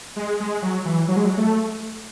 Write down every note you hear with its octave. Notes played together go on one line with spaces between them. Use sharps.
G#3
G#3
F#3
E3
F#3
G#3
F#3
A3